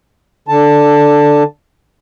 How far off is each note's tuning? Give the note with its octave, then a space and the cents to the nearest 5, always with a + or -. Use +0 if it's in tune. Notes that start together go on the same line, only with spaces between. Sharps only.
D3 +0 A5 +10